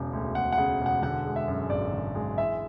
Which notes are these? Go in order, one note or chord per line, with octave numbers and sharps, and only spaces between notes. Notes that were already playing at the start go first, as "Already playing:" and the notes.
Already playing: E1 C#3
D2
E1 F#5
F#5
C#3
E1
F#5
D3 F#5
G#3
E5
F#2
G#1 D5
D3
G#3
E3 E5